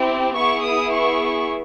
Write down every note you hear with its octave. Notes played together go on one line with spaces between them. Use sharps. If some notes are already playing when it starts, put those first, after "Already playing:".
Already playing: C4 E4 G4
B3 E4 G#4 C#6
D#6
C#6